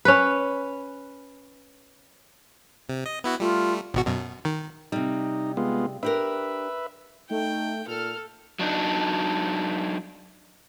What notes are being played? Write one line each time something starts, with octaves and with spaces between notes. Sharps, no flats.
C#4 B4
C3
D#5
B3 E4 F#4
G3 A3 F4
G#1 B2 F#4
F#2 B2
D#3
C3 G3 D#4
G#3 B3 F4
D4 G4 A#4 B4 E5
A3 D#4 G5
A#2 A4 F6
F#3 D4 D#4